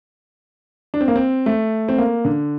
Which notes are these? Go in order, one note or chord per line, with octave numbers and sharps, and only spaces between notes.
D4
C4
A#3
C4
A3
C4
A#3
D3